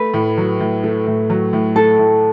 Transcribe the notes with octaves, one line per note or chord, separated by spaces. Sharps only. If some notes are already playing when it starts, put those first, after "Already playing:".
Already playing: A3 B4
A2
F#3
A2
A3
A2
F#3
A2
A3 A4
A2